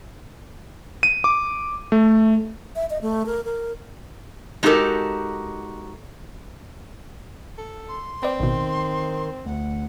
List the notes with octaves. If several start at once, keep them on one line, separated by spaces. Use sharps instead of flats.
D#7
D6
A3
E5
D#5
A3
A#4
A#4
G#3 D#4 F#4 G4 A4 A#4
A4
C6
C4 B4 D5
A1 B2 D#3
D2 F#5